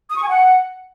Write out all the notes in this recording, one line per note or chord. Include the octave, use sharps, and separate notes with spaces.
D#6
C#6
G#5
F#5